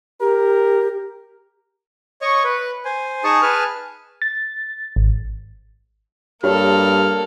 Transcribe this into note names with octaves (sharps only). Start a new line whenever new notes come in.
G4 A#4
C#5 D#5 C#6
B4
C5 G#5
D#4 G#4 A5 C#6 D#6
G#4 B4 G#5 A5 F6
A6
G#1
G2 A#3 F#4 G4 A4 C#5 F6